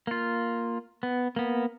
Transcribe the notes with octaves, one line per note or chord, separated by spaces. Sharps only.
A#3 F4
B3
A#3 B3